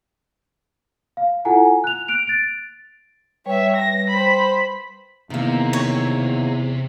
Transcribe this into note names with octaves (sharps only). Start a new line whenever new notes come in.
F5
E4 F4 A4 F#5 G#5 A#5
F#6 F7
F#6 D7 F7
A6 D7
G3 B4 C#5 E5 G5
A#6
C5 B5
E2 C3 D#3 A#3
C#5